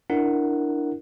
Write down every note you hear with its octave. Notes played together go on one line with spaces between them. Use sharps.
D4 E4 A#4 F#5